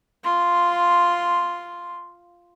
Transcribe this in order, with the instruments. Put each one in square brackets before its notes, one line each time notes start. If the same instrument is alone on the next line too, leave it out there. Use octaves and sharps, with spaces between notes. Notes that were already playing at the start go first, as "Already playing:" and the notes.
[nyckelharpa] F4 C6